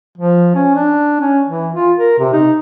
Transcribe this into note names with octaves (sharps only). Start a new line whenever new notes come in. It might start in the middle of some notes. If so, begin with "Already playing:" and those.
F3
C#4
D4
C#4
E3
F4
A#4
C3
D#4